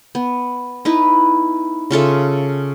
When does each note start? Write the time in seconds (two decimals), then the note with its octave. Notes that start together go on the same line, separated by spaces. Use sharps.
0.15 B3
0.85 D#4 E4 B4
1.91 C#3 F4 A4 E5